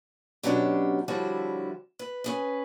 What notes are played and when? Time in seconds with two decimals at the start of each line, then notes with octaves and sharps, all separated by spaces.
0.43 B2 F#3 B3 C#4 D4 G4
1.08 D3 F3 G3 E4 F#4 C#5
1.99 B4
2.24 C#4 G#4 B4